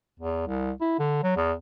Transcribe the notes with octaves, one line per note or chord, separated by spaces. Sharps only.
E2
C2
E4
D3
F#3
E2